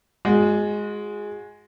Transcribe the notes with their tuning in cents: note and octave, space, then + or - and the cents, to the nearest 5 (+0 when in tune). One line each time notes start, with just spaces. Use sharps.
G#3 +0 F#4 -35